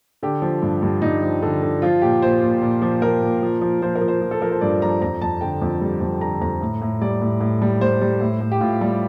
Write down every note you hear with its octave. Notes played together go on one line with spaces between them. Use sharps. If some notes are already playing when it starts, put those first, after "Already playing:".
D3 G4
F3
G2
G2
G2 D#4
F3
D3
D3
F3 F4
A#2 G4
A#2 C5
A#2
A#2
F3
F3 A#4
A#2
F3
F3
F3 C5
A#4
F3
C5
F3
A4
F3 A#4
C5
G2 D5
F3 A#5
F2 A#5
F2 A5
D3 G5
F2
G3
F2
D3 A#5
F2 A#5
A2
A2
G3 D5
A2
A2
G3
G3 C5
G3
A2
A2
G4
A2 F4
G3